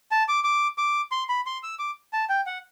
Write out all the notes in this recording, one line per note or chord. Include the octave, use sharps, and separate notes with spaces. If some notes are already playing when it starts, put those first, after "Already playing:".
A5
D6
D6
D6
C6
B5
C6
E6
D6
A5
G5
F#5